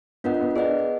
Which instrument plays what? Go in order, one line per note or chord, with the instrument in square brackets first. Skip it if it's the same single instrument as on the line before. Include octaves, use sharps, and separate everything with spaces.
[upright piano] B3 [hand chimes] D4 F4 A#4 D#5 F#5
[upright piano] B3
[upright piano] D4 [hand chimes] G#4 B4 D#5 F#5